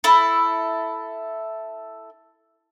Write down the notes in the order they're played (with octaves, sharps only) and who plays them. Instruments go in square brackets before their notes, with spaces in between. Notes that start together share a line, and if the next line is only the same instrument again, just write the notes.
[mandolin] E4 A4